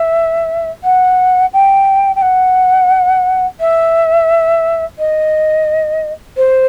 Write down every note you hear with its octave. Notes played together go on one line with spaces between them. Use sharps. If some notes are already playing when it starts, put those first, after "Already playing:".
Already playing: E5
F#5
G5
G5
F#5
E5
D#5
C5